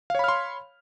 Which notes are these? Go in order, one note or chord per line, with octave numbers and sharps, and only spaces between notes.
C#5 F5 B5 C6 F6